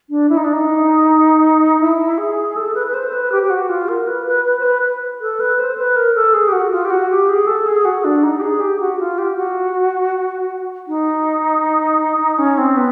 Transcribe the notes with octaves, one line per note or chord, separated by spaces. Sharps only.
D4
E4
D#4
D4
D#4
E4
G#4
A4
B4
B4
C5
B4
G4
G4
F#4
F4
A#4
B4
B4
B4
C5
B4
B4
A4
B4
C5
B4
A#4
A4
G#4
G4
F#4
F4
G4
F#4
G4
G#4
A4
G#4
F#4
D4
D#4
G4
G#4
G4
F#4
F4
G4
F#4
D#4
C#4
C4
B3